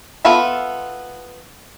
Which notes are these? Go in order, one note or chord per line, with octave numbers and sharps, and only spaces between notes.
B3 F4 A4 E5 B5